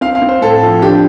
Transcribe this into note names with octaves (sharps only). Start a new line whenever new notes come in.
C4 F5
F5
C4
C5
A2 A4
F3
D4 G4